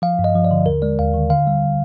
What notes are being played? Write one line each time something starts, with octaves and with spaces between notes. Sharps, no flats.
F3 F5
G2
D#5
F3
D5
D3
D#2 A#4
G#3 D5
D#2 F5
D#3
D3 F5
G3